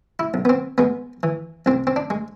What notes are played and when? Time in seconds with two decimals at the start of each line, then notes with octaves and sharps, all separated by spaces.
0.19 E4
0.34 B1
0.45 B3
0.49 C4
0.78 G#3 B3
1.23 E3
1.66 C2 C4
1.87 C4
1.96 D4
2.10 G#3